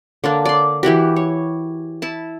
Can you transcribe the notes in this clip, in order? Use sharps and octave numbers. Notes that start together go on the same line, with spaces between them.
D3 A#3 D4
D5 C6
E3 E4 F#4 G4
C#5
E4 A5